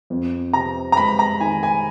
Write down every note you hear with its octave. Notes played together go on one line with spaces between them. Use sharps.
F2
C3 A#5
A#5
G#3 B5
A#5
D#3 G#5
G#5